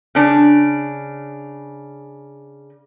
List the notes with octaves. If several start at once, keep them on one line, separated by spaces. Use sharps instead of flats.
C#3 D4